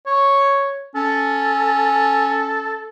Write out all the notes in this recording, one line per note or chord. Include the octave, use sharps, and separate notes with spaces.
C#5
C#4 A4